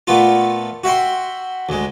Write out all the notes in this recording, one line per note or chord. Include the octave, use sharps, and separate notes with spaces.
A#2 A3 B3 F4
F#4 E5 G5 C6
D2 G#3